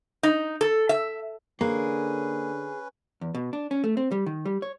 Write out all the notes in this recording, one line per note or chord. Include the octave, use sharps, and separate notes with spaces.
D#4
A4
E5
D3 A#3 C#4 G#4 B4
E2
B2
D4
C#4
A3
C4
G3
D#3
G3
C#5